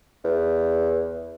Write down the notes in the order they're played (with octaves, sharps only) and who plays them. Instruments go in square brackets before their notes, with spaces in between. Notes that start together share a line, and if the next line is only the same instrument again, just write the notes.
[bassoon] E2